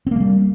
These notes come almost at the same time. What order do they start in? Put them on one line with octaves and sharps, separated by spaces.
C4 A#3 G#3 G3